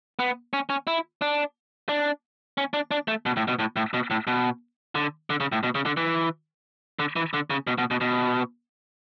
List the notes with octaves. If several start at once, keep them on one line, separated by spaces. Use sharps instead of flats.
B3
C#4
C#4
E4
D4
D4
C#4
D4
D4
A3
B2
A2
B2
A2
A2
B2
A2
B2
D3
D3
C#3
A2
B2
C#3
D3
E3
D3
E3
D3
C#3
B2
B2
B2
B2